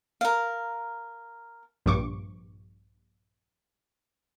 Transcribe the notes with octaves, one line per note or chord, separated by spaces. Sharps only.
A#4 F5
A#1 G2 C#6 D6